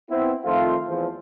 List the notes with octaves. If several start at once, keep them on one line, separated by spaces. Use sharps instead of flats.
B3 C4 E4
D#3 F3 A3 C4 F4
E2 F3